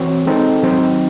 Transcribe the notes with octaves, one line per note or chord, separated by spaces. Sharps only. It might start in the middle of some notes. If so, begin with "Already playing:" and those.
Already playing: E3 C4 F#4 C#5
G#3 C4 D#4 A4
D#3 F#3 C4 D#4